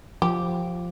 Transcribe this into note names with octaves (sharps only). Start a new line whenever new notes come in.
F3 G4